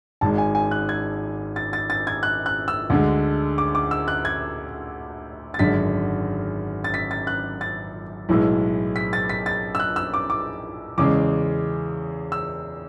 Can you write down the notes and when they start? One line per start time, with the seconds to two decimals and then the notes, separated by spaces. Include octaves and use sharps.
0.21 G#1 G#2 G#3 A5
0.38 G#5
0.55 G#5
0.71 F#6
0.89 G#6
1.56 A6
1.73 A6
1.90 A6
2.07 G#6
2.23 F#6
2.46 F#6
2.68 E6
2.90 D2 D3 G#3
3.58 D6
3.75 D6
3.91 E6
4.08 F#6
4.25 G#6
5.54 A6
5.59 G#1 F#2 D3 G#3 B6
6.84 A6
6.94 B6
7.11 A6
7.27 F#6
7.61 A6
8.29 B1 A2 E3 G#3
8.96 B6
9.13 A6
9.29 B6
9.46 A6
9.75 E6
9.80 F#6
9.96 E6
10.14 D6
10.30 D6
10.98 E2 C#3 G#3 D6
12.32 E6